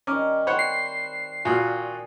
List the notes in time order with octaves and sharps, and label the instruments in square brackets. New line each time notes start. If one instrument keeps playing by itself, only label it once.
[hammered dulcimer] D#3 G3 [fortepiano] C#4 [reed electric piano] A#5 D6 F6
[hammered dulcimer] C4 [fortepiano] C5 C#5 F#5 [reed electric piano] B5
[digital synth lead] C7
[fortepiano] A#2 F4 F#4 [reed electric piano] G#5 D#6 F#6